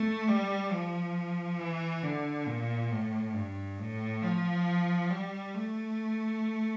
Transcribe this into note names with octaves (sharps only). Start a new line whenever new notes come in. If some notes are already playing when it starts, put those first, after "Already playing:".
Already playing: A3
G3
F3
E3
D3
A#2
A2
G2
A2
F3
G3
A3